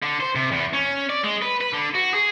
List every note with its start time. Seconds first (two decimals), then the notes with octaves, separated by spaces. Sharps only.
0.02 D3
0.20 C5
0.35 C3
0.52 E2
0.73 C#4
1.09 D5
1.24 G#3
1.42 B4
1.61 B4
1.73 D3
1.95 F#4
2.14 G#4